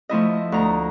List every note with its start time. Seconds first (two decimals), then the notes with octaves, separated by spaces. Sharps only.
0.09 F3 A3 E4 D#5
0.52 D2 A#5